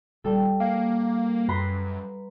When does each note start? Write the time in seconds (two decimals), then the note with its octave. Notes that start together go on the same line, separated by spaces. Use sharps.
0.24 D#1 G3 A4
0.60 A#3 F5
1.48 F#2 B4 A#5 C6